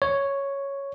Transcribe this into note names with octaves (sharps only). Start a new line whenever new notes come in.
C#5